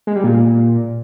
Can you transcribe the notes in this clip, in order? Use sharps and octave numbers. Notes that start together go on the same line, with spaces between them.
G#3
G3
A#2